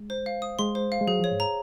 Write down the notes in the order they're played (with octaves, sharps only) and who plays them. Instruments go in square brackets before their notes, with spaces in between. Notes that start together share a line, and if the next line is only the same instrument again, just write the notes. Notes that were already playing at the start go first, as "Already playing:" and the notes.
Already playing: [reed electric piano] G#3
[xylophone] C5
F5
D#6
[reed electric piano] G#3 [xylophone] C6
[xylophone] C5
F5
[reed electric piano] G#3
[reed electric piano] F#3 [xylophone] G#4
[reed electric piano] F3 [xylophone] C#5
[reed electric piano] G#2
[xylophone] A#5